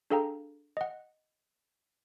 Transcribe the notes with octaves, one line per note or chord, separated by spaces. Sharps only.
D4 G#4 A4 F5 G5 A#5
D#5 F#5